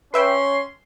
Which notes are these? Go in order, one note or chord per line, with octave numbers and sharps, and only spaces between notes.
C#4 B4 E5 G5 C6